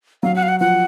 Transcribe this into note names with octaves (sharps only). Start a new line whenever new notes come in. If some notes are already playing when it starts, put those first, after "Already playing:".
F#3 F5
F#5
F5
F#5
F3 F#5